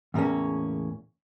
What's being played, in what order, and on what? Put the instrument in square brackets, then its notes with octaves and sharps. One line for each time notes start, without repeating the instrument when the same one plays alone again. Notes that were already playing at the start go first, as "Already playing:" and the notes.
[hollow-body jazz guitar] E2 A2 C#3 A#3 C#4